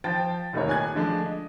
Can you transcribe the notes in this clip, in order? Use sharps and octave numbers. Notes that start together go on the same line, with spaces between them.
F3 C5 G5 A5 A6
F1 D#2 A3 D#4 A#4 C#5
D#1 G#5 F#6 G#6
D3 F3 G#3 A3 D4
D#5